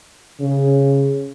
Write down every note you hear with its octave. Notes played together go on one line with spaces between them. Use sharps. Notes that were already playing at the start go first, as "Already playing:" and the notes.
C#3